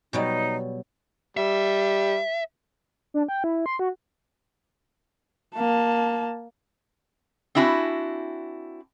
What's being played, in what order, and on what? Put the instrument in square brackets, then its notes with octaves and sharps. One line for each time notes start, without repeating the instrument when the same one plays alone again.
[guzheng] B2 F#3 G3 [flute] D#4
[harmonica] G3 [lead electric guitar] E5
[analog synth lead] D4
G5
E4
C6
F#4
[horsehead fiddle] A#3 A5
[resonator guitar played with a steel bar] C4 D4 E4 F#4 G#5